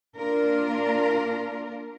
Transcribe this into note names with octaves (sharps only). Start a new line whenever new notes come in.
A#3 D4 F4 A#4